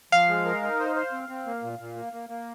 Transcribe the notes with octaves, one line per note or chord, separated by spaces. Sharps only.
F3 F5
G#3
A#4
D#4
C5
C5
C4
C4
A#3
A#2
A#2
A#3
A#3
A#3